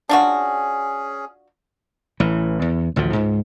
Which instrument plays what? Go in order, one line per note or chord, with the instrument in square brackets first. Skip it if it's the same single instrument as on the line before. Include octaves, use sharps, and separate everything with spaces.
[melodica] C#4 G#4 [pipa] D4 F4 F#4
[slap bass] A1 E3
E2
A1 D2 A2 F3
C#2 G#2